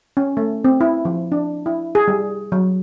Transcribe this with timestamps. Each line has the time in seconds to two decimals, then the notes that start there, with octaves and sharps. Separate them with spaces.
0.17 C#4
0.37 A3
0.64 C4
0.81 E4
1.05 F3
1.32 D4
1.66 E4
1.95 G#4
2.08 G3
2.52 F#3